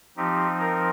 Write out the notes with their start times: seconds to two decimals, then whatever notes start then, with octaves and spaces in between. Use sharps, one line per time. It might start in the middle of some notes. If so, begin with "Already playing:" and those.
0.17 F3 C4 D#4 G4
0.60 A#4